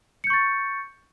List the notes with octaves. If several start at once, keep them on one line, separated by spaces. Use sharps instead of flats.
C#6 G6 A6 C#7